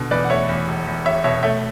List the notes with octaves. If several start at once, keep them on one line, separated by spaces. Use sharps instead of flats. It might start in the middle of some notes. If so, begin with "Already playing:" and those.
Already playing: B2 D3
E2 B4 D5
F#5
A3 C#5 E5
E2
E1
E2
E1 C#5 E5
B2 C#5 E5
A3 C#5 E5